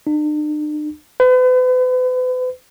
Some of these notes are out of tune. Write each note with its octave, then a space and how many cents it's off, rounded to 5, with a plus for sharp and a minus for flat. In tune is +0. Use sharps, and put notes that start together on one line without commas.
D4 +45
B4 +40